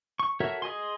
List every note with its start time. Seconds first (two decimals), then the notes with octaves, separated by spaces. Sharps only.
0.20 C#6
0.40 F#4 A4 A#4 C#5 E5
0.62 G#4 D#5 G#5 C6